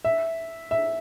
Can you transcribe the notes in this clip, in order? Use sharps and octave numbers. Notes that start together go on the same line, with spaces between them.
E5
E5